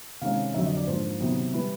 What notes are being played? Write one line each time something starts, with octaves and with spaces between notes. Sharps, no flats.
C3 D#3 G#3 C#4 F5
F2 D3 F#3 E5
D#5
D5
G#2 F3 A#3 D4 C5
C3 D#3 F#3 B3
E3 G3 B4